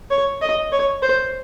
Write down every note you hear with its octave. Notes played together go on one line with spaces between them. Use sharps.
C#5
D#5
C#5
C5